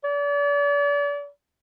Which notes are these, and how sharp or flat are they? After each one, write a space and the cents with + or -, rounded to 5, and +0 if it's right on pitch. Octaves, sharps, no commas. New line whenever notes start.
D5 -40